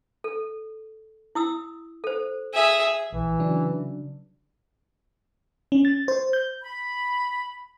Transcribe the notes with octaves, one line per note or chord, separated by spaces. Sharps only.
A4
E4 D#6 E6
A4 C5
G#4 E5
A#1 E3
C#3 F#3 D4
C#4
A6
C5
G6
B5